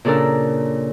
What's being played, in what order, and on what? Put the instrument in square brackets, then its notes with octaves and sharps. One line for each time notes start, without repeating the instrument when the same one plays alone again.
[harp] A#2 C#3 D4 A4 A#4